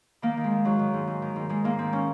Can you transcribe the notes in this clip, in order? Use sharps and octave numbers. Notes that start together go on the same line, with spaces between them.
D#3 A#3
D#3
G#3
D#3
G#2 F#3
D#3
G#2
G#2
D#3
G#2
G#2 G#3
G#2 A#3
D#3 C4
C#4